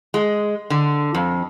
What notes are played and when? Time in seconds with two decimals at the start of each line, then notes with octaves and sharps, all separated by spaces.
0.14 G#3
0.70 D3
1.15 F2